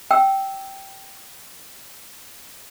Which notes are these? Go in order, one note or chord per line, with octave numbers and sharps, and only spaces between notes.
G5 E6